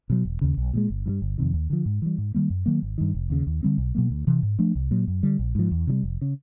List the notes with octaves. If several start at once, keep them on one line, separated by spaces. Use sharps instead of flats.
B2 F#3
E1
D#2 C#3
B1
A#2 F3 G#3
G1
G2 D3 G3
G1
F2 C3 D#3
D#2
D3 F3
G#2
E3 G3
G#2
D#3 G3 A#3
F#2
D#3 F#3 A#3
G#1
G2 D#3
F1
D#2 C#3
D#2
D3 G3 C4
B1
B2 F#3 A#3
D2
C3 E3
G#2
F3 A3 D4
C2
A#2 F#3
F#2
D3 G3
A#1
G#2 F3
E2
C3 D#3 G3
F1
C#3